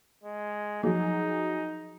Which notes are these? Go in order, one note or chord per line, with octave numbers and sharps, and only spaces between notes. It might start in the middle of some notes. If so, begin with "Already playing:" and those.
G#3
F3 F#3 D#4 G#4